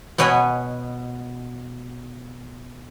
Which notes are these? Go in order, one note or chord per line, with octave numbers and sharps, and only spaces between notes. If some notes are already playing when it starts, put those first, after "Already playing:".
B2 B3 C#5 D#5 G#5 B5